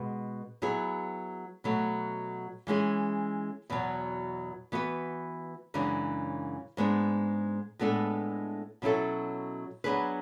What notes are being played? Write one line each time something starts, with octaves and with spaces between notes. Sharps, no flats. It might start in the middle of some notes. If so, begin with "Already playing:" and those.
Already playing: B2 G#3 B3
F#3 B3 E4 G#4
B2 F#3 A3
E3 G#3 C#4 E4 G#4
E2 B2 F#3
E3 B3 F#4 B4
F#2 C#3 E3 G#3 D4
G#2 G#3 B3 D4
A2 G#3 B3 D4 A4
B2 F#3 C#4 E4 A4
F#3 B3 D4 G#4 B4